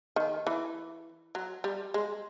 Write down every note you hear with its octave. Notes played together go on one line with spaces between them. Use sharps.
D#3
E3
F#3
G3
G#3